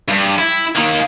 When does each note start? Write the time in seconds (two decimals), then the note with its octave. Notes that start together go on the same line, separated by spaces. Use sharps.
0.09 G2
0.39 E4
0.76 D#3 A#3